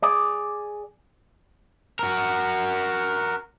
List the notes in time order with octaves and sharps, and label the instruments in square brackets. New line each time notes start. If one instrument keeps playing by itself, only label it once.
[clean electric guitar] G#4 D5
[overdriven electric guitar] F#4 A#4